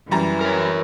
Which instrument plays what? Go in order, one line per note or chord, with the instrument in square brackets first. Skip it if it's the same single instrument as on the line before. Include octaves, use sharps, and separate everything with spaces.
[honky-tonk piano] F#2 G3 A#5 [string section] E3
[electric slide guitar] A#4 C#5